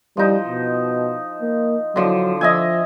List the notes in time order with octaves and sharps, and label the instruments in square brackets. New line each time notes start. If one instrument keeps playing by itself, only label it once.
[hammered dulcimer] F3 D#4 [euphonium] G3
[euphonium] B2
A#3
[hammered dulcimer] D3 F3 [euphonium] F#3
[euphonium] F3 [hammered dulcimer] D#5 E5 G#5